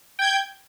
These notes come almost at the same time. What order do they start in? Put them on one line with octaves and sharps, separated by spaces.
G5 G#6 G6